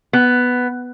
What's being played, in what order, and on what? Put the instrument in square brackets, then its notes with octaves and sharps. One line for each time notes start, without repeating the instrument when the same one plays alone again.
[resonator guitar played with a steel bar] B3